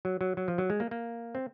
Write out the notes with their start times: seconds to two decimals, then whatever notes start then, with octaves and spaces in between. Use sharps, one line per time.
0.05 F#3
0.21 F#3
0.37 F#3
0.48 F3
0.58 F#3
0.70 G#3
0.80 A#3
0.91 A#3
1.35 C4